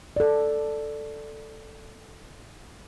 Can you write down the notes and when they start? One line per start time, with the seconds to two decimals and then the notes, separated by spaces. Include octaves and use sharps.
0.16 A4 D5